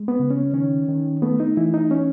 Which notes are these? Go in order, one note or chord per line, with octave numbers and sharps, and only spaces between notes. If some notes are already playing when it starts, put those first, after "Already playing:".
Already playing: G#3
B3
C#3
C#4
D#3 C#4
D#3
A3 B3
D#4
E3 E4
D#4
C#4